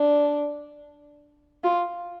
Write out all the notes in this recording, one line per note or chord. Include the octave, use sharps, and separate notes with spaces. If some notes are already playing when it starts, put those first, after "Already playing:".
Already playing: D4
F4